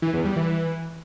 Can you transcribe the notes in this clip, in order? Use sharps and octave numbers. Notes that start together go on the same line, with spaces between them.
E3
E2
G3
E3